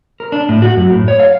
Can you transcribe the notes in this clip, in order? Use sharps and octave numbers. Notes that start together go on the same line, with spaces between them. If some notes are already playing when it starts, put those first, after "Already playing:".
A#4
D4
A2
F#4
F#2
A2
C#5
F5